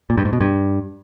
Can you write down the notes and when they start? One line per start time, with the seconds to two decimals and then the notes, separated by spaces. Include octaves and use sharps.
0.10 A#2
0.17 G2
0.25 G#2
0.33 B2
0.40 G2